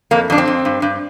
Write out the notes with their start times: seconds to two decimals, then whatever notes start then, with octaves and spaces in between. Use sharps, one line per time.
0.11 F2 A#3
0.30 F2 D4
0.38 C4
0.47 F2
0.65 G2
0.82 G2